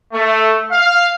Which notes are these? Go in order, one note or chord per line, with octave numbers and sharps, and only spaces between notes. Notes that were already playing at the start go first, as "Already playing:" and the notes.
A3
F5